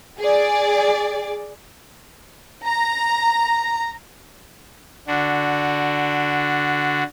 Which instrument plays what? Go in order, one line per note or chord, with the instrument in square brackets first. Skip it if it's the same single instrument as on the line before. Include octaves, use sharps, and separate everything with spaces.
[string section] G#4 D5
[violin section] A#5
[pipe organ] D3 D4 F#4